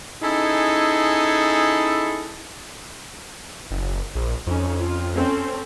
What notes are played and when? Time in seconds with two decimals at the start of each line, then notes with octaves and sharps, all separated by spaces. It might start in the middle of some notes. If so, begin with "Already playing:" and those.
0.23 C#4 D#4 E4 G#4 A4
3.71 F#1
4.15 A#1
4.46 F2 C#4 D#4
4.80 F4
5.15 C4 C#4 A4